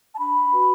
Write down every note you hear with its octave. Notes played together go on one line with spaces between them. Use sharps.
A5
D4 B5
F#4 B4